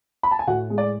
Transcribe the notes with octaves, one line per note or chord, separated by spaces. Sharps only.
B5
A5
G#5
A2 F#4 F#5
G#3
D5